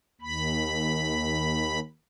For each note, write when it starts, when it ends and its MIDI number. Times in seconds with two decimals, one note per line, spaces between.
0.21 1.79 39
0.21 1.79 83